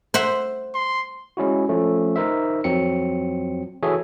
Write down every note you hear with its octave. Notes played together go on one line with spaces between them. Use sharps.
C5 E5 F#5
C6
G#3 C#4 E4 F#4
F3 A3 C#4 A4
D#4 A#4 C5 E5
F2 F#3 C4 C#7
E3 F#4 G#4 A4 C#5 E5